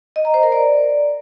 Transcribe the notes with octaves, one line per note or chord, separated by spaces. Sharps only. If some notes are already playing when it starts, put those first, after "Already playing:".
D#5
A#5
C5
A#4
D5